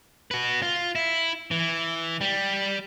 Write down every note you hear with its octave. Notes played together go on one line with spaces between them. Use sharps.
F#4 B4
F4
E4
E3
G3